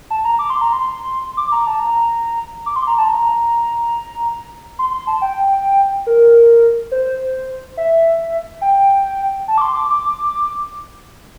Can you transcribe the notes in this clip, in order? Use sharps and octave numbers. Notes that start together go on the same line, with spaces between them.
A5
A#5
D6
C6
A#5
C6
D6
A#5
A5
A#5
D6
C6
A#5
A5
A#5
C6
C6
A5
G5
A#4
C5
E5
G5
A5
D6
C6
D6
D6